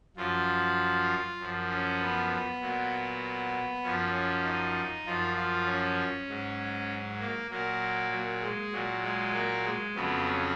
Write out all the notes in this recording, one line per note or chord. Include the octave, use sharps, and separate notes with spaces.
F#2 F3 F4
F#2 F3
C#4
B3
B3
A#2 F#3
F#2 F3 C#4
C#4
D#4
F#2 F3 F4
F4
C#4
G#2 F#3
A#3
A#2 F#3 A#3
F#3
G#3
A#2 F#3
G#3
A#3
G#3
F2 C#3 F#3 B3
C#4